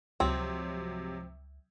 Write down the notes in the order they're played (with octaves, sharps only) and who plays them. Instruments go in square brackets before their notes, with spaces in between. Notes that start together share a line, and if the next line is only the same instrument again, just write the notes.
[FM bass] C#2 [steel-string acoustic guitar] G#2 F3 [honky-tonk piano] C3 F#3 [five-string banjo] C4